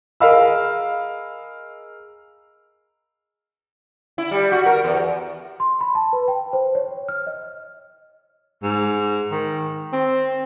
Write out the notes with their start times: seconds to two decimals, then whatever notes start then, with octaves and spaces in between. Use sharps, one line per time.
0.20 G#4 A#4 D#5 F5 B5 E6
4.18 E4
4.31 G3
4.52 F#4
4.66 A#4
4.84 E2
5.60 C6
5.81 B5
5.95 A5
6.13 B4
6.28 G5
6.53 C5
6.75 C#5
7.09 F6
7.27 D#5
8.63 G#2
9.32 D#3
9.93 C4